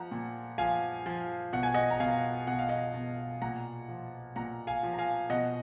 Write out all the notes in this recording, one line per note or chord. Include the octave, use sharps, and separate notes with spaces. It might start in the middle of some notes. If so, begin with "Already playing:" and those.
Already playing: F3 F#5 A#5
A#2
F3 F5 G#5
F3
B2 F#5
G#5
D#5 F#5
A#5
B2 F5 G#5
B2 F#5
F5
D#5 F#5
B2
A#2 F#5 A#5
F3
A#2 F#5 A#5
F5 G#5
F3
A#5
F5 G#5
B2 D#5 F#5